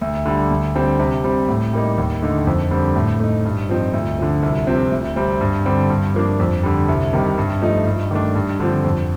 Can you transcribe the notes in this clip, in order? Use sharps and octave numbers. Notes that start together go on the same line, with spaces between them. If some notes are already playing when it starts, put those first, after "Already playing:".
D2
D3 G3
D2
D3 G3 C4
C3
G3 C4
A2
G3 A#3 D#4
D#2
D3 A3 D#4
F2
D3 G3 C4
A2
A3 D#4
G2
F3 C4 D#4
D2
D3 F3
C2
C3 F3 C4
D2
C3 G3 C4
G2
D3 G3 C4
G2
F3 A#3 D4
F2
D3 G3
C2
C3 D#3 G3
G2
F3 A3 D#4
G2
D#3 A3 D4
G2
D3 F3 C4
F2